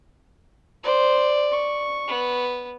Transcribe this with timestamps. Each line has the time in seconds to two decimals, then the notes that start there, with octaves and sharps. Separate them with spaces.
0.84 C5 D5
1.52 C#6
2.08 B3